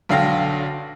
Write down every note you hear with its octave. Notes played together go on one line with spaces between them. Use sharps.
B1 D3 F5 G5 A#6